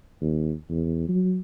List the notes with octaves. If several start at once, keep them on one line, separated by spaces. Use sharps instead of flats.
D#2
E2
F#3